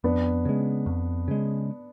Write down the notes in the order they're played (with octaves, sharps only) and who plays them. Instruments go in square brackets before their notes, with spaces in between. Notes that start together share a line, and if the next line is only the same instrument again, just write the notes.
[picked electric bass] F2 [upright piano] B3 D4
[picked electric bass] C#3 G#3
F2
C#3 G#3